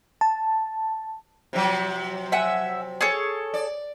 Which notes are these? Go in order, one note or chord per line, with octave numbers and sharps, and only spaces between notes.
A5
C3 F3 F#3
E5 F#5 G#5
G#4 A4 C#5
D5